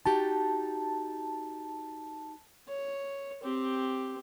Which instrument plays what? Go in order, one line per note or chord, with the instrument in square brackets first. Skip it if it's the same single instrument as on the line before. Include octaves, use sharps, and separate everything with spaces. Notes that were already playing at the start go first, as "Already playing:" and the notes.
[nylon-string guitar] D#4 F#4 G4 [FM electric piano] A5
[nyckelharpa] C#5
C4 G4